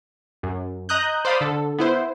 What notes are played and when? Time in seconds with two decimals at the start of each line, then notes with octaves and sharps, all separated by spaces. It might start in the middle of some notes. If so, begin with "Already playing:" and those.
0.43 F#2
0.89 D#5 A#5 D#6 F#6 G6
1.25 C5 D5 F5 B5 D#6
1.41 D3 A4
1.78 B3 E4 C5